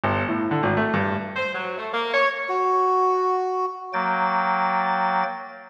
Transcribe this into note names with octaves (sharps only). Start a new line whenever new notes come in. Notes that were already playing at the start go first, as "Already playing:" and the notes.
G1
A2
D3
G#1
A3
G2
C5
F#3
A3
A#3
C#5
F#4
F#3 A#3 G5 A6